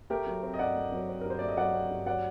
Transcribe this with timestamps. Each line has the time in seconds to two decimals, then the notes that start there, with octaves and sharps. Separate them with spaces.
0.10 A3 G4 A#4
0.27 F#3
0.43 C4
0.54 D#5
0.59 G2 D5 F#5
0.75 A3
0.92 F#3
1.09 C4
1.21 G2 A#4
1.30 C5
1.39 A3 D5
1.49 D#5
1.57 F#3 D5 F#5
1.73 C4
1.90 G2
2.06 F#3 D5 F#5